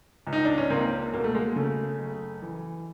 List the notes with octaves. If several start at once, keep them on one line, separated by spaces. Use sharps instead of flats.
C#2
D#4
D4
C#4
C#2 A#3 C4
B2 A#3
A3
G#3 A#3
C#3 A3
F#1
E3